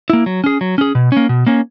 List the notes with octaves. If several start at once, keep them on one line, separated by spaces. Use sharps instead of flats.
A#3 E4
F#3
C#4 G#4
F#3
C#4 G#4
B2
A#3 C#4
B2
A#3 C#4